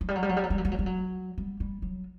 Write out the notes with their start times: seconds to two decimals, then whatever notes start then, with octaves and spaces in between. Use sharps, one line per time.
0.01 F#3
0.08 G3
0.15 F#3
0.23 G3
0.29 F#3
0.36 G3
0.44 F#3
0.50 G3
0.58 F#3
0.65 G3
0.72 F#3
0.79 G3
0.86 F#3
1.38 G3
1.60 G3
1.82 F#3